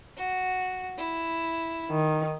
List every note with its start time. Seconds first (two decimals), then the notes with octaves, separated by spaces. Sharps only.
0.17 F#4
0.98 E4
1.91 D#3